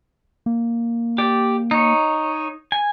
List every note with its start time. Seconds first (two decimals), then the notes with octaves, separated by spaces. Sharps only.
0.46 A#3
1.18 G4 D5
1.71 D#4 C#5
2.72 G#5